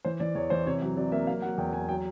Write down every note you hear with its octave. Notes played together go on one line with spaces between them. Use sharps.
E3 C5
E3 D5
E2 C#5
E3 C5
C3 C#5
F#3
C3 D5
A#3 E5
F#3 F5
F#3 F#5
E2 G5
E2 G#5
F#3 G5